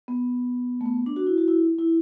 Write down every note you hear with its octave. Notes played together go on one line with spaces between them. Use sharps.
B3
A3
B3
D4
F#4
E4
F#4
E4
E4